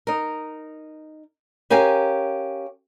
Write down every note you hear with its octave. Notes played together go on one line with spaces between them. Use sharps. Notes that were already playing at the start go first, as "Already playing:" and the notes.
D#4 A#4
C#4 G4 A#4 F5 G#5